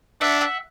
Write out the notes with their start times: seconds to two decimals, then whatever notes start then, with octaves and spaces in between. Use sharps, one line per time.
0.21 D4 E5 F#5
0.41 E5 F#5